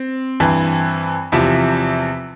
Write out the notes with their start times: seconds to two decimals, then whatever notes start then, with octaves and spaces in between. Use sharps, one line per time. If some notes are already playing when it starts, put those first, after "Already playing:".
Already playing: C4
0.40 G2 E3
1.32 E2 C3 F3 E4 E5